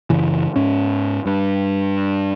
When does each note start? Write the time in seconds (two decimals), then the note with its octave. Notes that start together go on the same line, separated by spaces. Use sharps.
0.10 F#2 C#3 E3
0.56 G#2 C#4
1.26 G2